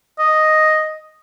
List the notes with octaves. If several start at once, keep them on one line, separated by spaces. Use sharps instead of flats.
D#5